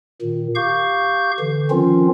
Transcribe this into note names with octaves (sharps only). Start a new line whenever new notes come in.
A#2 D#3
G4 F5 C#6 G6
D3 E3
D#3 F3 C4 C#4 F4